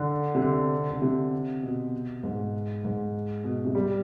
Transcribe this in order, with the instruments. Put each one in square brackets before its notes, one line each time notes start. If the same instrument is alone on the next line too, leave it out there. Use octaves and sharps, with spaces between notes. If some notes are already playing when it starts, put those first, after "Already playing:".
Already playing: [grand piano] D3
C3
D3
D3
C3
B2
G#2
G#2
B2
C3
G3